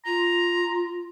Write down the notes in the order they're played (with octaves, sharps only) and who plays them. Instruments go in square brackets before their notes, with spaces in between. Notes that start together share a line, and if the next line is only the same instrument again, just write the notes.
[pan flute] F4 [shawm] A#5